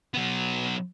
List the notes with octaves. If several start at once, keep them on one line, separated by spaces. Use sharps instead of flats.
F#3 B3